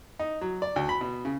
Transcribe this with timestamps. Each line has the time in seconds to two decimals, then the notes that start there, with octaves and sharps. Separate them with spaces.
0.19 D#4
0.41 F#3
0.62 D5
0.76 D2
0.89 B5
1.01 B2
1.25 C#3